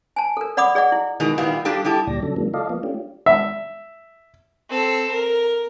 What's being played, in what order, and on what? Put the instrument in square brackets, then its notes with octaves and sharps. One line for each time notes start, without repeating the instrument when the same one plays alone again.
[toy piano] G#5 A5
A4 A#4
D5 F#5 B5 D6 D#6
G#4 D5 D#5 F#5
E4
[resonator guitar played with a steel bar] B2 D#3 E3 G#3
A#2 D#3 G3 B3 E4 F4
G3 D4 F4 G4 A4
G3 E4 G4 A4
[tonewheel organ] D2 A#2 G3 D5 A#6
C#3 F#3 D4 A4
C#3 E3 F#3 G#3 A#3
F4 A4 D5 D#5 F5
F3 A#3 B3
A3 C#4 D4 F4 G4
[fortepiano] E5
[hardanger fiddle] C4 A4
A#4